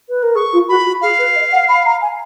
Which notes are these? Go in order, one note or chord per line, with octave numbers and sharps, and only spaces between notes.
B4
A#4
G#4 C#6
F4
F#4 B5
F#4
G#4 F5
B4
D#5
F#5
B5
A#5
G#5